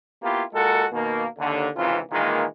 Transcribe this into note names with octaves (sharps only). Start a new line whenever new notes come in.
A#3 B3 E4 F4 G4
A#2 G#3 F#4 A4 A#4
B2 D#3 A#3
D#2 D3
G#1 C#2 C3 E3 F4
A#2 D#3 E3 G#3 A#3